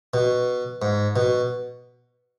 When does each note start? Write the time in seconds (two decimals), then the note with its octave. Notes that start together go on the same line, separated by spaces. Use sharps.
0.14 B2
0.82 G#2
1.16 B2